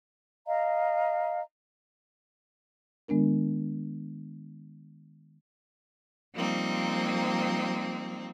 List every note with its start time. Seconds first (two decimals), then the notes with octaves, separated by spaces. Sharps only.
0.47 D#5 F5 A#5
3.08 D#3 G#3 B3 D4 A#4
6.35 F3 G3 A#3 C4 D#4